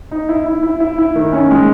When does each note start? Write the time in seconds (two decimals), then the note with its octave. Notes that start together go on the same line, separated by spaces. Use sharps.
0.11 D#4
0.29 E4
0.46 E4
0.63 E4
0.80 E4
0.98 E4
1.16 D#3
1.33 C#4
1.51 G#3